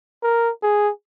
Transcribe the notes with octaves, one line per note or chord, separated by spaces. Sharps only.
A#4
G#4